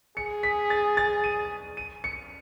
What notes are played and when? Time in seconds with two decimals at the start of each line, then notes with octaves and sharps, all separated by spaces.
0.17 G#4 C#7
0.43 B6
0.70 A6
0.97 A6
1.24 D#7
1.77 D#7
2.04 C#7